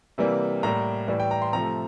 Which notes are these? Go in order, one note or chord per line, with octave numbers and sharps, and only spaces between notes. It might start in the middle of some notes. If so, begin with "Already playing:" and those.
C3 E3 G3 A#3
A2 G3 A#3 A#5
A2 E3 G3
G5
A#5
C6
C3 F3 A3 A#5